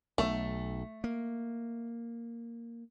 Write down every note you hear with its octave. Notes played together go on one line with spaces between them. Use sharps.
B1 A3
A#3